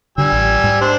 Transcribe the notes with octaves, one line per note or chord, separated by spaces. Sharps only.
D3 G3 G#5 E6
A1
G#2
D4 C5